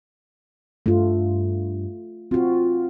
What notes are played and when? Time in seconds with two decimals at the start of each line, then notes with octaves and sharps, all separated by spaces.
0.86 G2 A3 F4
2.31 C4 F4 F#4